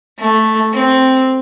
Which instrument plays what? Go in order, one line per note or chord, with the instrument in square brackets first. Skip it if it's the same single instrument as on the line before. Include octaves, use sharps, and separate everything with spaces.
[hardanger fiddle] A3
C4